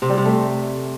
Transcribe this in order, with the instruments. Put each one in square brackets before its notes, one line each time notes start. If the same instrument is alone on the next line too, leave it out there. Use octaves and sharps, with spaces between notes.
[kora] C3
G3
C3
A3